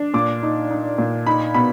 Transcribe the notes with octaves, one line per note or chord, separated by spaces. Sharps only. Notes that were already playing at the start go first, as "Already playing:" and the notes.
Already playing: D4
A#2 D6
D#4
D#4
A#2
D#4 B5
B2 B5